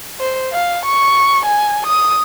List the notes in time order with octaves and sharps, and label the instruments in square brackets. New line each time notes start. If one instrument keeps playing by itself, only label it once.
[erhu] C5
F5
C#6
G#5
D#6